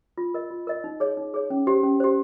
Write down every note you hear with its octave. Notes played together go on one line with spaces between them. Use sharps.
F4
A#4 D#5
F4
A#4 D#5
D#4
G#4 C#5
D#4
G#4 C#5
C#4
G4 C5
C#4
G4 C5